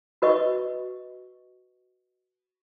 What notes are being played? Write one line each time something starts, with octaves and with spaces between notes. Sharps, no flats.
F#4 B4 D#5 C#6